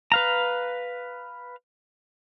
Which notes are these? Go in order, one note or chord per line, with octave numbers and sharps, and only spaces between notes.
B4 F5 A#5